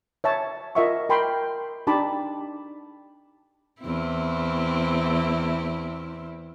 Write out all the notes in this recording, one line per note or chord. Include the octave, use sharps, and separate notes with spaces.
C#5 E5 A5
F4 A#4 D#5 E5 F#5 C#6
A#4 G5 B5 C6
D4 D#4 G4 A5 B5 D6
E2 C4 E4